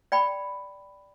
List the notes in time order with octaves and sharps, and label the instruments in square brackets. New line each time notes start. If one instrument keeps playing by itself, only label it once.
[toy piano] D5 G5 B5